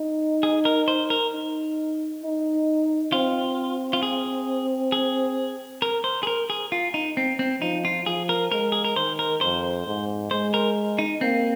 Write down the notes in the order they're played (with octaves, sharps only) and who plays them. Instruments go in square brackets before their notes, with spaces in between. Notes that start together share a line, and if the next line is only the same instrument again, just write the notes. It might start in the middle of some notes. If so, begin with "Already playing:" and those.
Already playing: [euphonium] D#4
[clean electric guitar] G#4
A#4
C5
A#4
[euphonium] D#4
D#4
[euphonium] C4 [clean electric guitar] F4
[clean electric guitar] F4
G#4
G#4
A#4
C5
G#4
A#4
G#4
F4
D#4
C4
C4
[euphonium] F3 [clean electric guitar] D#4
[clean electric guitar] F4
[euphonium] F3 [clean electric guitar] G#4
[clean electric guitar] A#4
[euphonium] G#3 [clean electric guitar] A#4
[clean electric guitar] G#4
A#4
[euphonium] D#3 [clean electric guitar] C5
[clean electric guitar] A#4
[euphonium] F2 [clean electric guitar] C5
[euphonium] G#2
[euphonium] G#3 [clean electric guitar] C5
[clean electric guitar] A#4
D#4
[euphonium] A#3 [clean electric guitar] C4